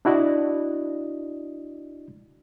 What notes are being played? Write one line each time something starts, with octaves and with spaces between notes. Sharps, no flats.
D4 E4 F#4 D5 D#5